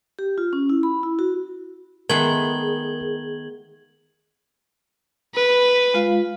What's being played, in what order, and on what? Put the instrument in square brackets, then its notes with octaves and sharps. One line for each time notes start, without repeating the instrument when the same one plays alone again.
[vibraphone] G4
F4
C#4
E4
B5
E4
F#4
[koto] D#3 B3 [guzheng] G#3 A3 [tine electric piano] A#4 [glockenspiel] G#6 F#7 G7
[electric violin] B4
[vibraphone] G#3 F4 F5